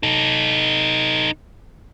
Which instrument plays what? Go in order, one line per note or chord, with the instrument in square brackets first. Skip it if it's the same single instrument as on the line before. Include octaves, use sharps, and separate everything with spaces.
[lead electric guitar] D#4 A4